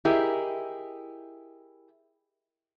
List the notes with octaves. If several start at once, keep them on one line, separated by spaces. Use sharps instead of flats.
E4 G4 G#4 A#4 D#5